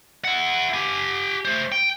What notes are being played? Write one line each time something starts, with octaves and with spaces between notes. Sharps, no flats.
E4 F#5
G4 G#5
A3 C5
G5